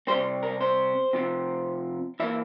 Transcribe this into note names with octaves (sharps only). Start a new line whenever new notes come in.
C3 G3 C4 C5
A#4
C5
C3 F3 C4
E3 A#3 E5